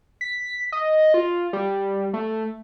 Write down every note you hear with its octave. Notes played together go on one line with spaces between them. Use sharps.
B6
D#5
F4
G3
A3